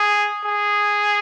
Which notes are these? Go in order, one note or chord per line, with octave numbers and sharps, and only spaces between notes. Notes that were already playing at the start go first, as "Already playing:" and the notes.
Already playing: G#4
G#4